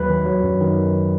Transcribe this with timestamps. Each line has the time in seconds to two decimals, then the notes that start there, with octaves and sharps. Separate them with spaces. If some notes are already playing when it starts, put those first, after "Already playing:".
Already playing: D#2 F#3 B4
0.09 D#3
0.26 F#3
0.43 F#2
0.61 D#3